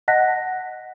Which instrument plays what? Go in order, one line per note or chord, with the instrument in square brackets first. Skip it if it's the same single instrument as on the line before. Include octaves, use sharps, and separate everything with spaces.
[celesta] D#5 F#5 A5 F#6 A#6 B6